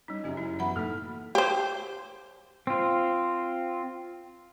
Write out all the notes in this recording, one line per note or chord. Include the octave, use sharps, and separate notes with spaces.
G3 C#4 D#4
F#1 F#2 C#4 G4
E4
E3 F#3 B3 E5 F#5 B5
A2 A#3 D#4 A4 F6
G4 C5
C4 F4